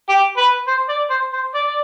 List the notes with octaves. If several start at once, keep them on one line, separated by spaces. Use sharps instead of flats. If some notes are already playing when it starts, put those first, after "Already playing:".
G4
B4
C5
D5
C5
C5
D5
D5